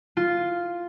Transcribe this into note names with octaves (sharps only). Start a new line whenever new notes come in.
F4